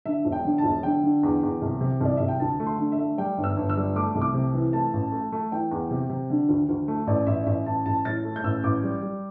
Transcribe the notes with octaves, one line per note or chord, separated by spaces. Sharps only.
D3 E5
E1
G5
D3
A5
E1
D3 G5
D3
E2
E2
C2
C3
C2 D5
C2 E5
G5
D2 A5
A3
C6
D3
E5
A3
G3 G5
G1
E6
G1
E6
G3
A3 D6
C2
D6
C3
E3
A3 A5
A1
A3
A3
E3 G5
E2
C3
C3
D3
D2
D2
A3
A1 D5
A1 E5
D5
A1 E5
A1 A5
A1 A5
A2 A6
A3
G6
A1 E6
A1 D6
G3
G3